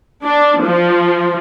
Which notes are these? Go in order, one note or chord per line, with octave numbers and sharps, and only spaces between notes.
D4
F3